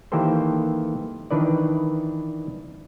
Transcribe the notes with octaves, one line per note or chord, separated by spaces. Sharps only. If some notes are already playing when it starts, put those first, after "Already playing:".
D#3 E3 A#3 G4 A4 C5
D#3 E3 D4 B4 D5